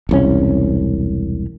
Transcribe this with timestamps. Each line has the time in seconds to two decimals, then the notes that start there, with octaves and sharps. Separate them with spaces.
0.09 E1 C2 C#4